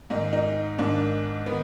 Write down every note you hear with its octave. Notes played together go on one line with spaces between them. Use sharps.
G#2 D#3 D#4
D#4
G#2 D#3 D4
D#3 B3